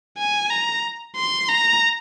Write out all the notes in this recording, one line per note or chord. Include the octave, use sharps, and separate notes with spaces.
G#5
A#5
C6
A#5